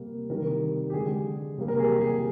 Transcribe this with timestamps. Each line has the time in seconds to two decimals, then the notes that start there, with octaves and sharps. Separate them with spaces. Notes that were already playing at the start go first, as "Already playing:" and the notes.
Already playing: C3 G3 A#3
0.30 C3 D#3 G3 A#4
0.90 G4
0.93 D3 G#3 G#4
1.58 C3 G3 A#3
1.68 A#4
1.79 G#4
1.89 G4
2.00 G#4